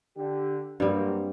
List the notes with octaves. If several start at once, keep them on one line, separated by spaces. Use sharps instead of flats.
D3 G4
G2 F#3 G3 A#3 C4